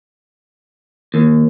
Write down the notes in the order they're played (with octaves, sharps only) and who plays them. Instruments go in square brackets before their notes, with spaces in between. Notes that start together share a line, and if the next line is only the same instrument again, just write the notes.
[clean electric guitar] D#2